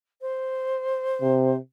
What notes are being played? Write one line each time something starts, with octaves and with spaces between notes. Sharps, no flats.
C5
C3